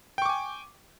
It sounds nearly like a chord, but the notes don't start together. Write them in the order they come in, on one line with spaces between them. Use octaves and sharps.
G5 C#6 D6 G#5